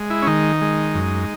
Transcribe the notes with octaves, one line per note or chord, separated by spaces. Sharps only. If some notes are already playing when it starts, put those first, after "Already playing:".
Already playing: G#3
E4
C#4
D#3 D#4
G#3
F#2